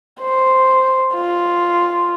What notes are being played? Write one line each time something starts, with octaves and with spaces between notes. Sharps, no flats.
C5
F4